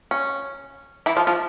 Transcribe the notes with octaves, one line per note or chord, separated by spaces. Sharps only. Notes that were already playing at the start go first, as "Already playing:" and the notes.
C#4
E3 E4
F3 F4
F3 F4